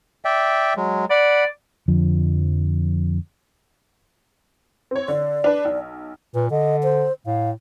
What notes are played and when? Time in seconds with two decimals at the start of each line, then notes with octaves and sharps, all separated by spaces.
0.25 D5 E5 G5
0.77 F#3 G#3
1.10 D5 F#5 B5
1.88 F2 D3 F3
4.91 C4 C#5
5.08 D3 D5
5.44 D4 B4
5.65 B1
6.34 A#2 B4
6.51 D3 D#5
6.83 C5
7.26 A2 F5